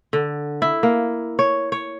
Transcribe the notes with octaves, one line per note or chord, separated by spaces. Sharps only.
D3
E4
A#3
C#5
C#5